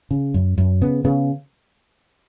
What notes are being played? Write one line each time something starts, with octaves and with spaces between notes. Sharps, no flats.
C#3
F#2
F#2
C#3 B3
C#3 B3